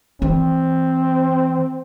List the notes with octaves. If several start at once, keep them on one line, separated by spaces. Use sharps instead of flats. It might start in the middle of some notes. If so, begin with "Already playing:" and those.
E3 C4